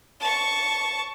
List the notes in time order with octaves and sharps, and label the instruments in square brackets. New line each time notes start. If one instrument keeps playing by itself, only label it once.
[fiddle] A5 C#6